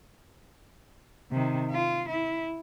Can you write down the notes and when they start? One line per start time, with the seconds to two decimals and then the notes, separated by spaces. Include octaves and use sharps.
1.31 C3 D#3
1.71 F4
2.09 E4